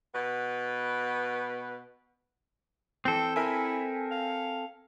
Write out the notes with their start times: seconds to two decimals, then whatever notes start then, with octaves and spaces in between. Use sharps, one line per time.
0.15 B2 B3 B4
3.05 E3 C4 A4 G5
3.36 E4 A#4 E5 G#5
4.12 F5